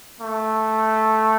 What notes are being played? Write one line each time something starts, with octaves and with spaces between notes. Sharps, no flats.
A3